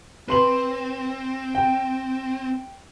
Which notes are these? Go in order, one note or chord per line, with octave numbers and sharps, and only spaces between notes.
C4 B4 C6 F#7
G5